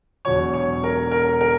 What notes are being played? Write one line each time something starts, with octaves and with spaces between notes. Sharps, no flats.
E1 E2 B2 F#3 C#5
C#5
A#4
A#4
A#4